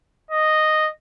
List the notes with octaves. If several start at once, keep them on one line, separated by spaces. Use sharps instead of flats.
D#5